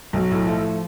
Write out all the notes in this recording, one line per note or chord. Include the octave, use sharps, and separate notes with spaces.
B1 F#3
A2
F3 A3